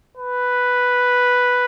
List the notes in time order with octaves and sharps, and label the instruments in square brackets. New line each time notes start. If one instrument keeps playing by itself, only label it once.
[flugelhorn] B4